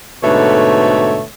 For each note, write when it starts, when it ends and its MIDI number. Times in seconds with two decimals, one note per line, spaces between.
0.23 1.24 44
0.23 1.24 47
0.23 1.24 50
0.23 1.24 57
0.23 1.24 71
0.23 1.24 73